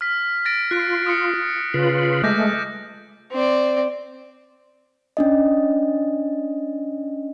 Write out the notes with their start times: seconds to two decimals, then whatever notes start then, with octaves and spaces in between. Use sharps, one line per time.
0.01 F6 B6
0.45 A6 A#6 D7
0.71 F4 F#6 D7
1.06 D#6 F6 C#7
1.74 C#3 F4 B4
2.24 G#3 A3 D6 G6 A#6
3.32 C4 D5
5.17 C#4 D4 D#5